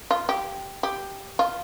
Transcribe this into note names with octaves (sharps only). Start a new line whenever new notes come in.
F4
G4
G4
F4